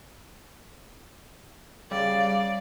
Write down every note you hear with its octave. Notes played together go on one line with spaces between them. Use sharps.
C#3 G3 D5 F5